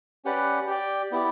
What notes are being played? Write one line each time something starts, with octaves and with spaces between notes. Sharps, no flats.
C#4 G4 B4 D5 F#5
G4 D5 G5
B3 E4 G4 D5